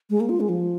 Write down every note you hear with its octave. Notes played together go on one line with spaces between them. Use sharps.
G#3
A#3
F4
G#3
F3